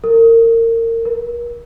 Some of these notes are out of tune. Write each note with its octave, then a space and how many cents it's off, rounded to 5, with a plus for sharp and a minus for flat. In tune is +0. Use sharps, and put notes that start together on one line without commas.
A#4 -30
A#4 +40